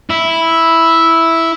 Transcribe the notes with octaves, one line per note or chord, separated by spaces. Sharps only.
E4